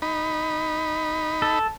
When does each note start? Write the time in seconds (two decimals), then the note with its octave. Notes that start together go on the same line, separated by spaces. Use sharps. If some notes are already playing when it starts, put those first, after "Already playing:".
0.02 D#4 B5
1.42 A4